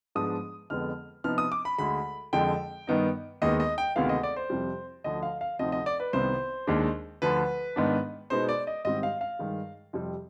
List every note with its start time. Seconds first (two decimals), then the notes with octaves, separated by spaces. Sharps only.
0.15 G#2 F3 G#3 B3 D4 D#6
0.70 F2 D3 G#3 B3 F6
1.24 C3 F3 B3 D#4 F6
1.38 D#6
1.52 D6
1.65 B5
1.78 D2 D3 G#3 B5
2.33 F2 D3 G#3 G5
2.87 G2 D#3 B3 D#4
3.42 D#2 D#3 G#3 B3 D#5
3.60 D#5
3.78 G5
3.96 D2 C3 D#3 G#3 B3 F5
4.09 D#5
4.23 D5
4.36 C5
4.50 F2 C3 G3
5.04 D2 D3 F3 D#5
5.23 F5
5.41 F5
5.59 D2 C3 F3 C4 D#4 D#5
5.72 D#5
5.86 D5
6.00 B4
6.13 C2 C3 D#3 B3 D#4 C5
6.67 D#2 D#3 G#3 D4
7.22 D2 D3 F3 B4
7.76 G#2 D#3 B3 D4
8.30 B2 G#3 B3 D#4 C5
8.49 D5
8.67 D#5
8.85 G#2 D#3 G3 C4 D#5
9.03 F5
9.21 F5
9.39 G2 D#3 G#3
9.93 F2 C3 G3 C4